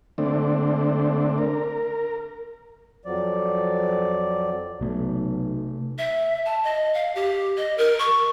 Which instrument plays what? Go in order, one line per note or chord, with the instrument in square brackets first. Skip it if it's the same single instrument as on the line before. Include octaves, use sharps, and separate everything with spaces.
[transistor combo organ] D3 A3 C4 D4
A#4
[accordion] F2 F3 F#3 D5
[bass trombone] B1 [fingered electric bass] C3 A3
[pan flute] E5
A5
D#5
F5
G4
D#5
A#4
C#6